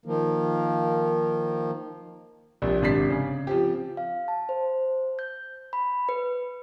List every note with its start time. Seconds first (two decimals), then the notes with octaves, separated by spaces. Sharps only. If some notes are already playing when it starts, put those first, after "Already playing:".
0.06 D#3 F3 A#3
2.62 A#1 C3
2.82 G#1 C3 D4 D5 B6 C7
3.10 C#3
3.47 F3 C4 G4
3.97 F5
4.28 A5
4.49 C5
5.19 G6
5.73 B5
6.09 B4